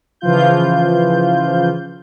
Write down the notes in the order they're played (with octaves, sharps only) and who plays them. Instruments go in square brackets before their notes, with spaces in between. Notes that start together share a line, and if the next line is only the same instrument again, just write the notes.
[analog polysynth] C#3 E3 F3 F4 G6